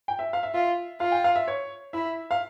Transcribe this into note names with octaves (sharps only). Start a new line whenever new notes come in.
G5
E5
F5
E5
F4 E5
F4 F5
G5
F5
E5
C#5
E4 E5
F5